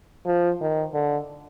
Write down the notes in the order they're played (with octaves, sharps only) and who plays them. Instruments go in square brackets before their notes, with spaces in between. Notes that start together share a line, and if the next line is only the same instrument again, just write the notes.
[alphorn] F3
D#3
D3